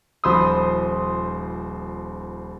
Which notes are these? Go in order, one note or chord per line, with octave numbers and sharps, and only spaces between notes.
D#1 F3 C5 B5 C6 D#6